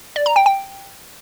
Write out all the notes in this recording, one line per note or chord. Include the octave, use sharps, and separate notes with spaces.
D5
A#5
G5
G5